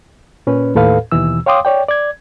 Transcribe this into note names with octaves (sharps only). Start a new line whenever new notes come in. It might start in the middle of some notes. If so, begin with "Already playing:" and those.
A#2 C#4 B4
D#2 A2 A4 B4 F5
D#2 B2 E3 E6
C#5 F5 G5 C6 D6 D#6
C#5 D5 G5
D5 G#6